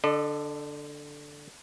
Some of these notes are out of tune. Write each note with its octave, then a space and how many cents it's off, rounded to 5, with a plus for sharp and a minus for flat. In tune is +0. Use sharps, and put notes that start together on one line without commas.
D3 +0 A4 +0 D#5 -45